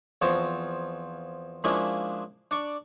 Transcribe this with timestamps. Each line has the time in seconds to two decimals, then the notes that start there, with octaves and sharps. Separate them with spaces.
0.22 E2 F3 C4 C#5 A5
1.64 F3 G#3 A#3 C#4 D4 E4
2.51 D4 D5 C#6